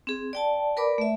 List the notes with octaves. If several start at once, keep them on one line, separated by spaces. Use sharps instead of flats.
C4 G#4
D5 G5 A5
A#4 B4 D5 B5 D6
A3 E5